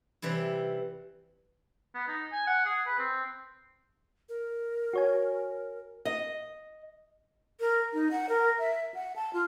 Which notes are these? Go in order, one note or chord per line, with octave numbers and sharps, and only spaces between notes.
C3 E3 G3 E4
B3
D#4
G#5
F#5
G#4
B4
C4
A#4
F#4 C#5 G#5
D#5
A#4
D#4
F#5
A#4
E5
F#5
A5
F4